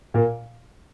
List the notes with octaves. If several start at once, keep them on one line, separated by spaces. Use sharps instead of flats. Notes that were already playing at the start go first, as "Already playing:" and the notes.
A#2 A#3